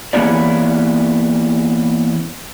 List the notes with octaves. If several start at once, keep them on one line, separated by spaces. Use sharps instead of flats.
E3 A#3 B3 C#4 E4 D5